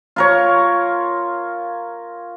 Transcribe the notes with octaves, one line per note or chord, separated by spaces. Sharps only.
F4 A#4 C#5